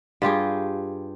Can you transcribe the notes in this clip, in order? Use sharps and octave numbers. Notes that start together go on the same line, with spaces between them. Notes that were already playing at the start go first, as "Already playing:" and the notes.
G2 F4 G4 G#4